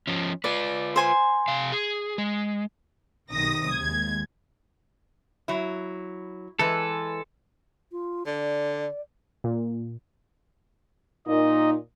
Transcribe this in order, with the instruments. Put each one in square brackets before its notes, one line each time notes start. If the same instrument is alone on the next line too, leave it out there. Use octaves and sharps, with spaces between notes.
[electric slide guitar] F3 C#4
[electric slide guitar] F4 B4 [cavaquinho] D5
[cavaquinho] C5 G#5 C6
[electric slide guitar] C3 F5
G#4
G#3
[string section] B1 C3 D#3 D#6 A#6
D#2 G#3 G#6
[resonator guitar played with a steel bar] F#3 E4
[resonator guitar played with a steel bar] E3 G#3 B4 [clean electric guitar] A4
[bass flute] F4
[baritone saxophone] D3 [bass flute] D5
[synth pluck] A#2
[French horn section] A#2 D#4 [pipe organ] D#5